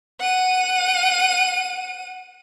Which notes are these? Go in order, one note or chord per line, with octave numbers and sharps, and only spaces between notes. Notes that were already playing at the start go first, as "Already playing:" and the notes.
F#5 D#7